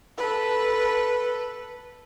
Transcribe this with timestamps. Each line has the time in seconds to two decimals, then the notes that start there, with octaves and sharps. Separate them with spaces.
0.18 A4 B4